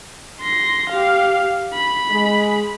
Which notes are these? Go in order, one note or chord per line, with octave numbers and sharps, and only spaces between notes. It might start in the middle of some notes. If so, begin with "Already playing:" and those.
C6 A#6
G4 F5
B5
G#3